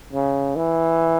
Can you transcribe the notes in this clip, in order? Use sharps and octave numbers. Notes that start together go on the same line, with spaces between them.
C#3
E3